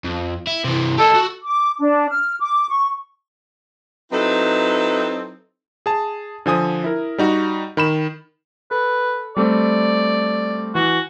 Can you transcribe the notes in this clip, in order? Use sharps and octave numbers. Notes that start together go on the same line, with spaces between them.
F2
E4
C3 E3
G4 A4 D#5
F#4
D6
D4
F6
D6
C#6
F#3 C4 D#4 E4 A4 B4
G#4 A5
D3 F3 G#5 D#6
E4 A#4
G3 D#4 F#4
D#3 B5 E7
A4 B4
G3 A3 C4 D5
E3 F#4